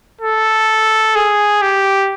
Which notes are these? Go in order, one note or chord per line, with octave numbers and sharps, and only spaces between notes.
A4
G#4
G4